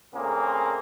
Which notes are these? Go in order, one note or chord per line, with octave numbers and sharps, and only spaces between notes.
A#2 C#3 A3 A#3 C4 G#4